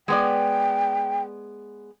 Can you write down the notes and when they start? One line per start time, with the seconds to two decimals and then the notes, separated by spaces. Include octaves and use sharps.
0.08 G#3 B3 D5 G5